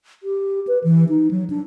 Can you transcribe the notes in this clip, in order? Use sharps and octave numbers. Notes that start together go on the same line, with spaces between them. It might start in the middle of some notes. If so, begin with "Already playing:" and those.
G4
B4
E3
D#4
F#3
D4